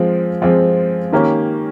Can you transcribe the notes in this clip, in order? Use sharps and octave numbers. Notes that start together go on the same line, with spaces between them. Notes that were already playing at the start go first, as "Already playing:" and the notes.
Already playing: F3 G#3 C4 F4
F3 G#3 C4 F4
D#3 A#3 C#4 G4